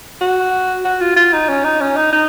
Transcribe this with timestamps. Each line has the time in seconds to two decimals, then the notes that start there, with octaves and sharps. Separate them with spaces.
0.21 F#4
0.85 F#4
1.01 F4
1.16 F4
1.33 D#4
1.49 C#4
1.64 D#4
1.81 C#4
1.96 D#4
2.12 D#4